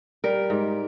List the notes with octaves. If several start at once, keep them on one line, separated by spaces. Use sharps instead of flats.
G3 A#4
G#2